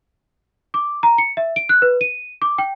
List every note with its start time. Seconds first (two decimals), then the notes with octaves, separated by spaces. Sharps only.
0.74 D6
1.03 A#5
1.18 C#7
1.37 E5
1.56 D7
1.69 F#6
1.82 B4
2.01 D#7
2.42 D6
2.58 G5